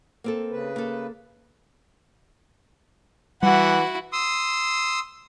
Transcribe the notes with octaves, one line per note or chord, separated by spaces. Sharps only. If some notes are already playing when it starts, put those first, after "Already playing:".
A#3 C4 A4
C#3 B4
A#3 A4
E3 G3 E4 F#4 F#5
C6 D#6 E6